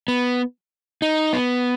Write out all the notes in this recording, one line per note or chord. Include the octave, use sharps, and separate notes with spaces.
B3
D#4
B3